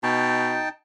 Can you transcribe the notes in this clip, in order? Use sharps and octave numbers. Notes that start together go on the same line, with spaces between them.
B2 D#4 G5 A5